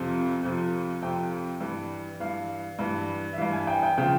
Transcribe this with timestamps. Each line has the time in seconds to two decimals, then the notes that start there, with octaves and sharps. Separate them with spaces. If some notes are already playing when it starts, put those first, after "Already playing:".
Already playing: F2 C3 F3
0.43 F2 C3 F3
1.02 F2 C3 F3 G5
1.60 G2 E3
2.20 G2 E3 F5
2.79 G2 E3
3.33 E5
3.38 G2 E3 F5
3.53 G#5
3.67 G5
3.83 G5
3.98 C#3 F3 G5